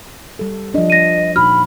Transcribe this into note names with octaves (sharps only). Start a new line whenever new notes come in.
G3 A4
F3 D4 D#5
A#6 D#7
A#2 D#4 F#4 B5 F6